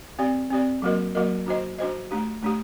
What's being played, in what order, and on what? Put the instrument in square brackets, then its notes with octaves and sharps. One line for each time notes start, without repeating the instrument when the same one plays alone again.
[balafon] C4 G4 D5
C4 G4 D5
F#3 A#3 F#4 A#4 D#5
F#3 A#3 F#4 A#4 D#5
D4 F#4 C5 D#5
D4 F#4 C5 D#5
A3 D4 G4
A3 D4 G4